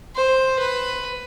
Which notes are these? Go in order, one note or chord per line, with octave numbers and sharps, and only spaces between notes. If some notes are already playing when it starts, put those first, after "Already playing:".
C5
B4